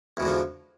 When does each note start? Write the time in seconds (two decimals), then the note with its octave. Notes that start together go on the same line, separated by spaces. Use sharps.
0.17 E2
0.20 B2
0.23 G#2
0.25 D3
0.28 F3